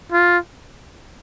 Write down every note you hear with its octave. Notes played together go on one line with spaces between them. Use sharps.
F4